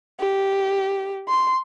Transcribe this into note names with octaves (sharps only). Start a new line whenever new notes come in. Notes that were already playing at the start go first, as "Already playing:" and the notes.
G4
C6